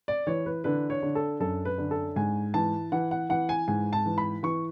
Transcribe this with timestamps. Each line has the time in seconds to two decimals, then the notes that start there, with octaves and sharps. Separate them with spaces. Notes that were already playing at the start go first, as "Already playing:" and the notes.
0.08 D5
0.27 E3 C#5
0.46 B4
0.64 D3 B4
0.90 C#5
1.02 D3
1.15 A4
1.40 F#2 A4
1.65 B4
1.78 D3
1.91 A4
2.16 G#2 G#5
2.54 E3 A5
2.92 E3 F#5
3.11 F#5
3.29 E3 F#5
3.49 G#5
3.68 G#2 G#5
3.93 A5
4.06 E3
4.18 B5
4.43 E3 C#6